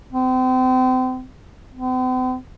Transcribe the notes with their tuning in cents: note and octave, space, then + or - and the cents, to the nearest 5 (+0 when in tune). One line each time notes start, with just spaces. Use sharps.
C4 -35
C4 -45